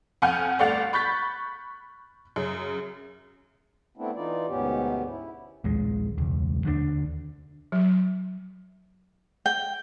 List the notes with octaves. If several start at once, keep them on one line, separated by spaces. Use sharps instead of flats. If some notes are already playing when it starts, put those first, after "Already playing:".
F2 F#5 G#5 F6 G6
G1 A3 D5 F#5 A6 F7
B5 C#6 F#6 G6 A6 B6
F#2 C#3
A3 B3 C4 D4 E4
E3 D#4 F4 D5
D2 G#2 B2 B3 C#4 G4
E4
A#1 D#2 G#3
E1 C#2
D#2 D3 F3 D4
F#3
G5